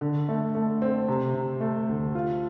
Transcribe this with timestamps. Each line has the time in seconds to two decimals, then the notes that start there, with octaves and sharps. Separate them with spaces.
0.01 D3
0.29 A3
0.55 A3
0.82 C4
1.08 C3
1.34 C3
1.61 A3
1.88 D2
2.15 F4